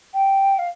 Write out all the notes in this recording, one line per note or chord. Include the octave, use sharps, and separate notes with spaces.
G5
F5